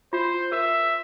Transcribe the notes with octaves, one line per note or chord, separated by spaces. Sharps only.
F4 C5
A#4 E5